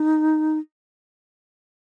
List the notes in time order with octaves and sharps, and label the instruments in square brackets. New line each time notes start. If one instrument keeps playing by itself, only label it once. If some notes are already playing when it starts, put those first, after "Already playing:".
Already playing: [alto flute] D#4